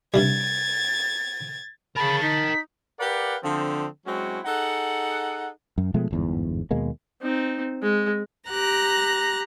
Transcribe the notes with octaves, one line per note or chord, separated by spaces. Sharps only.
G2 C3 G3 G#6 A6
C#3 A#4 G5 A5 B5
D#4 B6
G4 A#4 B4 D5 F5 F#5
D3 F3 C4
F#3 G#3 C4 C#4 E4 F#4
D#4 G#4 A4 F#5
F#2
B2 F3 G#3 A3
G1 E2 G#2
D#2 B2 G#3 A#3
C4 D#4
G#3
G4 A#5 F#6 A#6